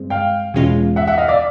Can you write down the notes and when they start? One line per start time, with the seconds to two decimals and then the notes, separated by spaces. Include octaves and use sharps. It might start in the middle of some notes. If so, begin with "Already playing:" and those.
Already playing: G2 G#3 C4
0.10 F5 G5
0.54 E2 B2 G#3 C#4 F4
0.96 E5 F#5
1.07 E5 F#5
1.18 D#5 F5
1.28 D5 E5